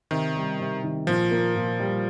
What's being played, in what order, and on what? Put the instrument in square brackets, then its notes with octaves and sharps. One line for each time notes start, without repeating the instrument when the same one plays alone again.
[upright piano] C3 [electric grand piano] D#3
[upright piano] G3
C3
D#3
[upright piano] A#2 [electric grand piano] F3
[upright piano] A#3
A#2
G3